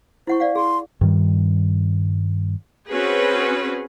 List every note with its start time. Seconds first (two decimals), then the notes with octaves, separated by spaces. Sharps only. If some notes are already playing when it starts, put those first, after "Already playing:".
0.27 E4 C5 F#5 C#6
0.40 D5 F5 F#5
0.55 G#4 C6
1.01 G2 D#3 G3
2.89 C4 C#4 F#4 G#4 B4